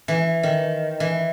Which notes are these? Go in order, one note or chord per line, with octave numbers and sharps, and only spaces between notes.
E3
D#3
E3